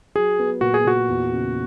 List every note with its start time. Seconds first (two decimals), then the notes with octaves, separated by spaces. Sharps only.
0.15 F#3 G#4
0.39 B3
0.61 A#2 F#4
0.74 G#4
0.85 A#2 F#4
1.09 E2
1.32 C#3